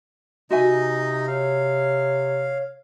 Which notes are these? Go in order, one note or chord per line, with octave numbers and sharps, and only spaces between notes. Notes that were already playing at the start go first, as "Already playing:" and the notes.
C3 D#4 F#4 D#5 E5 G#5
C#5 F5